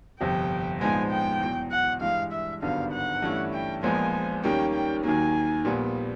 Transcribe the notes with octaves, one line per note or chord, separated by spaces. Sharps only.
G1 F2 C3 G5
A#1 G#2 F3 G#3 B3 G#5
G5
E2 B2 F#3
F#5
G2 E3 G#3 F5
E5
G#1 G2 D3 F#3 B3 F5
F#5
G2 E3 A3 C#4 E4
G5
A#1 A#2 F3 G#3 B3 G#5
D#2 D#3 G3 A#3 C#4 G5
G5
D#2 D#3 F#3 A#3 G#5
A#1 A#2 G3 B3